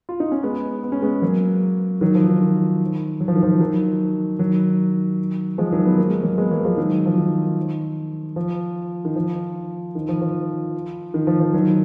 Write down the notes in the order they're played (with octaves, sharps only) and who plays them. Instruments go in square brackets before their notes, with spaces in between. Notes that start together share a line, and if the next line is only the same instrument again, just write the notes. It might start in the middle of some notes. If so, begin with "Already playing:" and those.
[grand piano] F4
D#4
C#4
G#3 B3
B3
C#4
G#3 B3
F#3 A#3
D#3 F#3
F3
D#3
D#3
F#3
F3
D#3
F3
D#3 F#3
D#3 F#3
F3 G#3
D#3 F#3
B3
A#3
G#3
F#3 A#3
G#3 B3
F#3 A#3
F3 G#3
D#3 F#3
F3
D#3
F3
D#3
F3
D#3
F3
F3
D#3
F3
F3
D#3 F#3